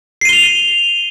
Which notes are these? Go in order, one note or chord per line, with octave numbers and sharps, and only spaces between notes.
C7 D#7 F7 G7